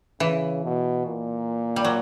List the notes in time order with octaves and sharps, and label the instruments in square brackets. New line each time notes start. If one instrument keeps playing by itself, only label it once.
[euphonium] C#3 [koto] E3
[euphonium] B2
A#2
[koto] G3
F#3